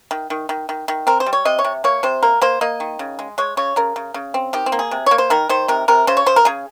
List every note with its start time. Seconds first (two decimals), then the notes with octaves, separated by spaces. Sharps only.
0.11 D#3
0.30 D#3
0.49 D#3
0.69 D#3
0.88 D#3
1.07 C4 A#4
1.20 C5
1.26 G3
1.33 C#5
1.45 C3 D#5
1.59 C#5
1.64 C3
1.84 A#3 C#5
2.03 C3 C5
2.23 A#3 A#4
2.41 A#3 C5
2.61 A#3 D#5
2.80 D#3
2.99 C#3
3.19 G#3
3.38 G#3 C#5
3.57 C#3 C#5
3.76 C#3 A#4
3.96 C#3
4.14 C#3
4.34 C4
4.53 D#3 G4
4.66 C4
4.72 A#3
4.79 G#4
4.91 C3
5.06 A#3 C#5
5.18 C5
5.30 D#3 A#4
5.49 D#3 C5
5.68 C3 A#4
5.88 C3 A#4
6.07 C#3 C5
6.17 C#5
6.26 C#3 C5
6.36 A#4
6.45 C#3 G#4